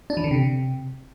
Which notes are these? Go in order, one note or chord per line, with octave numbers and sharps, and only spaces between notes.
D4
E3
D3
C3